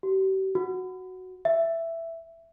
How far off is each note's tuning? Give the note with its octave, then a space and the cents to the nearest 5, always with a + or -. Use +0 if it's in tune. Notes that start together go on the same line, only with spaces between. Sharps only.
G4 -40
F#4 +0
E5 +10